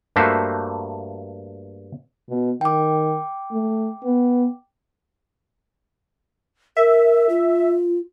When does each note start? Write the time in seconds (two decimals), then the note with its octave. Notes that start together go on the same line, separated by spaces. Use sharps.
0.16 G2 A3 A#3 F#4 C5 E5
2.29 B2
2.61 D#3 G5 D6
3.52 A3
4.04 B3
6.77 A#4 E5
7.29 F4